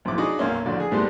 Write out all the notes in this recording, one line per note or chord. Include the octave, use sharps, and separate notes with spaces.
B1 F2 G#2 E4 D6
D4 D#4 F#4 G#4 F#5 D6
B1 F#2 A#3 C#4 E5
A1 F2 D3 F#4 D5
G#4
G#2 G3 A3 B3 D5 C6